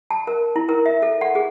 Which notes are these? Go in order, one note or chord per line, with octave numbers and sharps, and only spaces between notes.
A5
A#4
E4
A#4
E5
A4
F#5
G#4